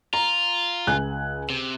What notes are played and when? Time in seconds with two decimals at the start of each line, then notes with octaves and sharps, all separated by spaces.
0.13 F4 A#5
0.87 C#2 G#5 F#6
1.50 C3